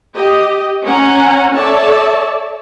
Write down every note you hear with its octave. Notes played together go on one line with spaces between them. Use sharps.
G4 D#5
C#4 F#5 G#5 A#5
A4 C#5 D5 E5 A5